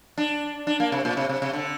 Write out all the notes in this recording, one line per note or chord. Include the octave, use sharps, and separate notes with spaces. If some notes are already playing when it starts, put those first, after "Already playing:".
D4
D4
A#3
C3
A#2
C3
C3
C3
D3